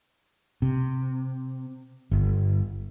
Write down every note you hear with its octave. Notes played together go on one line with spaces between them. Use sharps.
C3
G1